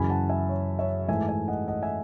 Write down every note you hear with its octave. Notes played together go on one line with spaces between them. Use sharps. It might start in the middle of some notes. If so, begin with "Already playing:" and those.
Already playing: F#2 C#3 E3 G#5 B5
F#5 A5
E5 G#5
C#5
C#5 E5
G#2 E3 A3 E5 G#5
E5 G#5
D#5 F#5
D#5 F#5
E5 G#5